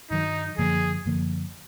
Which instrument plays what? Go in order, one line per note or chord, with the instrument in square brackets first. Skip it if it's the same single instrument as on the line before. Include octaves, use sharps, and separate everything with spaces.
[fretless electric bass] G2 D#3 F#3 [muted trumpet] D#4
[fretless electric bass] F#2 D3 F3 A#3 [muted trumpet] G#4
[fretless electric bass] F#2 D3 F3 A#3